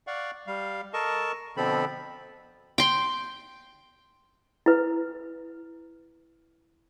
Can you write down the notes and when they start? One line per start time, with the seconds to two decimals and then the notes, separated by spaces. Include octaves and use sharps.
0.07 D5 F5 F#5 C#6
0.47 G3 F5
0.93 A4 A#4 D#5 A5 C#6
1.57 B2 D3 F3 C4 A4 B5
2.78 G5 C6
4.66 E4 B4